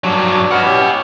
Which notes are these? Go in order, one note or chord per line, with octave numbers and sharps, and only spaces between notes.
G2 F#3 D4
B4 D#5 F#5 F6
C#4 E4 G4